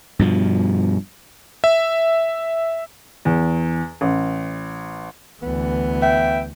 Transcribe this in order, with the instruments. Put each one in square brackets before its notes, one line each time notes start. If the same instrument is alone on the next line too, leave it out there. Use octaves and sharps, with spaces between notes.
[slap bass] G2 B2 F3
[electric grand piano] E5
[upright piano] E2
A1
[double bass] D2 E3 [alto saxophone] B3
[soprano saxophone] E5 [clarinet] G5